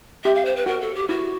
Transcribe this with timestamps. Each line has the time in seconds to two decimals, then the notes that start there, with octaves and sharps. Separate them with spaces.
0.24 G4 E5
0.35 F5
0.45 C5
0.56 B4
0.66 F#4 A#4
0.81 A4
0.95 G4
1.08 E4 F#4